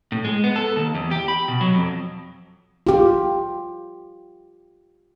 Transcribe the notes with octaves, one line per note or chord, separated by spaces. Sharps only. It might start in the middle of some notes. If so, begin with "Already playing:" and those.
A2
G#3
B3
A4
D#2
E2
G4
B5
B2
F#3
F2
F4 G4